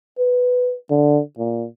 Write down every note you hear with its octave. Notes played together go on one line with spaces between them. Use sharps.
B4
D3
A#2